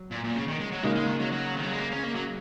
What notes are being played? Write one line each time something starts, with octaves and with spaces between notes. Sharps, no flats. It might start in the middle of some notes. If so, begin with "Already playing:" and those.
Already playing: F#3
A#2
A#2
C#3
D#3
G#3
F#3
C#3 G#3 A#3 D#4
G#3
D#3
F#3
F#3
D#3
F#3
G#3
A#3
C#4
A#3
F#3